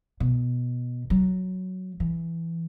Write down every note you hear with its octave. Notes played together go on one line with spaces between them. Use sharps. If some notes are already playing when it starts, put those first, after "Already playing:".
B2
F#3
E3